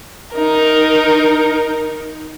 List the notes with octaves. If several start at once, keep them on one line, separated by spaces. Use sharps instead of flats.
D#4 A#4